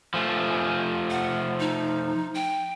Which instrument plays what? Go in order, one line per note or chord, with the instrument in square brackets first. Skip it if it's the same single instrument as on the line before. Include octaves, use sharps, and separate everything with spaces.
[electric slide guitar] F3 A3 [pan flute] G#5
[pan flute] F#5
D#4
G5